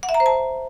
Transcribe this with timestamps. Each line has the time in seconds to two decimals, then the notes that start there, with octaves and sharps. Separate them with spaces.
0.03 F#5
0.09 E5
0.14 A#5
0.20 C5
0.26 A5